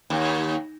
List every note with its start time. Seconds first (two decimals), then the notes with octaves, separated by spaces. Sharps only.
0.10 D#2